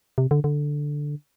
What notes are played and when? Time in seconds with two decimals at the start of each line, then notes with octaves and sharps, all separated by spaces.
0.18 C3
0.31 D3
0.44 D3